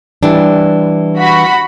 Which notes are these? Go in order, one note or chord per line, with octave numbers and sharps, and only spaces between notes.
E3 G3 D4
F#4 B5